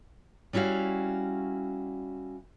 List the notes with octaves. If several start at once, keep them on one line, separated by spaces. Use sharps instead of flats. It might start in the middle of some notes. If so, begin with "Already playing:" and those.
G3 C#4 E4 F#4 F5